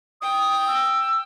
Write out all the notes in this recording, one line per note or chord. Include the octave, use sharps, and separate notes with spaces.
G5 D#6
E6